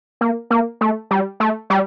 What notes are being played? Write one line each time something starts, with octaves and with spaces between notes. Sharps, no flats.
A#3
A#3
A3
G3
A3
G3